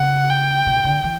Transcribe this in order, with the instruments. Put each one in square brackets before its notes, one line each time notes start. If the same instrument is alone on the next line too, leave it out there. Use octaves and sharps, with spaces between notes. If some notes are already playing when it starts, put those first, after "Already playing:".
Already playing: [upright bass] C#3 [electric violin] F#5
[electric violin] G5
[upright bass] B2
D3
E3